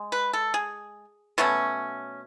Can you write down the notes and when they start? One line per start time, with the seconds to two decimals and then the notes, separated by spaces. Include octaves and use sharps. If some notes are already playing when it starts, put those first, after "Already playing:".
Already playing: G#3
0.12 B4
0.33 A4
0.54 G#4
1.38 B2 F#3 A3 C#4